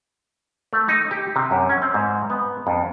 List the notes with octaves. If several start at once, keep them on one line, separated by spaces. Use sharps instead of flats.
A3
D#4
G4
C3
F#2
C#4
C4
G#2
B3
F2